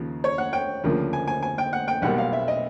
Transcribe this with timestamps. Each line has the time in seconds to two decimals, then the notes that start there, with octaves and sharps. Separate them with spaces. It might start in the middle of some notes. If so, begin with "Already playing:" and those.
Already playing: D#2 C#3 F3
0.24 C#5
0.38 F#5
0.53 G5
0.84 D2 C#3 F3 A#3
1.13 G#5
1.27 G#5
1.42 G#5
1.58 G5
1.73 F#5
1.88 G5
2.02 B1 B2 G3 A#3 F#5
2.18 F5
2.33 E5
2.48 D#5